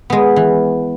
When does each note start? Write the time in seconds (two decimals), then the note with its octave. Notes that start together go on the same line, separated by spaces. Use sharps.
0.10 G#3 B3
0.36 E3